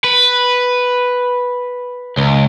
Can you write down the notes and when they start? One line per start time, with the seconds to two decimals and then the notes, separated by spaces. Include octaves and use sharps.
0.04 B4
2.18 C#2